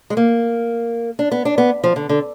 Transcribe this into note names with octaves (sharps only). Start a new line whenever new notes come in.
G#3
A#3
D4
B3
D4
B3
F3
D3
D3